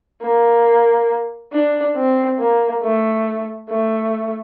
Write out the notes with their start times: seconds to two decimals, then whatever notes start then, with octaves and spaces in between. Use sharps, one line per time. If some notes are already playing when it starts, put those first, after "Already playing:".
0.22 A#3
1.53 D4
1.96 C4
2.39 A#3
2.83 A3
3.69 A3